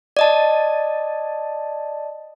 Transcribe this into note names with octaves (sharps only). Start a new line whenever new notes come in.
D5 D#5 A5